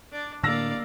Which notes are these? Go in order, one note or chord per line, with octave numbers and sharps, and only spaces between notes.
D4 D5
A2 D3 A#3 D4 D5 F5 E6 A#6